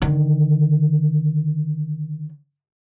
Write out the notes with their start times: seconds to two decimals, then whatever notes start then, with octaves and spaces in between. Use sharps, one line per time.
0.02 D3 D#3